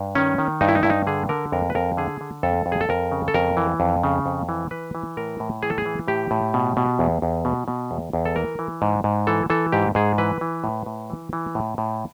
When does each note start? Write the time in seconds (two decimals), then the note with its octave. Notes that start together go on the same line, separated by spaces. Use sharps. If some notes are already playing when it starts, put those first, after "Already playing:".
Already playing: G2
0.15 D#3 C#4
0.38 D#3
0.61 G2 D#4
0.69 E4
0.75 D#4
0.83 G2 E4
0.90 D#4
1.07 D3 G#4
1.29 D3 A#4
1.52 F2 A#4
1.70 B4
1.75 F2 A#4
1.97 D3 G#4
2.21 D3
2.43 F2 A4
2.66 F2
2.72 G#4
2.81 A4
2.89 F2 A#4
3.12 C#3
3.28 A4
3.34 F2 A#4
3.57 E3
3.80 F2
4.04 C#3
4.26 F2
4.49 E3
4.71 E3 B4
4.95 E3
5.17 A2 A#4
5.40 A2
5.63 E3 G#4
5.70 A4
5.78 G#4
5.85 E3
6.08 A2 G4
6.31 A2
6.54 B2
6.77 B2
6.99 E2
7.22 E2
7.45 B2
7.68 B2
7.91 E2
8.13 E2
8.25 A4
8.36 E3 A#4
8.59 E3
8.82 G#2
9.04 G#2
9.27 E3 A4
9.50 E3 A4
9.72 G#2 G4
9.95 G#2 G#4
10.18 E3 B4
10.41 E3
10.64 A2
10.86 A2
11.10 E3
11.33 E3
11.55 A2
11.78 A2